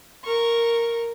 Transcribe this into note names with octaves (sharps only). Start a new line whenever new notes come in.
A#4 C#6